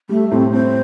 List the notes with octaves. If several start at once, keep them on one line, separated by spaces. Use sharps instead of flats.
G3 A3
A2 C4
C4 C5